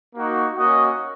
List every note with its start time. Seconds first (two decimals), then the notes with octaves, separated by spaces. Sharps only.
0.16 A#3 D#4 F#4
0.57 A#3 C#4 F#4 D#5